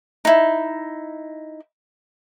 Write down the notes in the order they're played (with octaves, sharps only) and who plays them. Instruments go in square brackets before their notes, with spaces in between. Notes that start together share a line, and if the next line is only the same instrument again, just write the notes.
[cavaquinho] D#4 E4